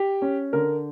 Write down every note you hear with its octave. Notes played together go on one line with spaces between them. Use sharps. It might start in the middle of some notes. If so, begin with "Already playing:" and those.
Already playing: G4
C#4
D3 A#4